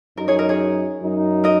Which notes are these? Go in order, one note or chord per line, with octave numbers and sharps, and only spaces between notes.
F#2 F#3 D#4 A#4
G#4 C#5
A#4 D#5
G#4 C#5
F#2 F#3 D#4
A#4 D#5